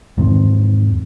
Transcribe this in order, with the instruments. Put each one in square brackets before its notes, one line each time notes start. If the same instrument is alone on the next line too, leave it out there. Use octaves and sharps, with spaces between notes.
[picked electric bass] E2 G#2 D#3 C4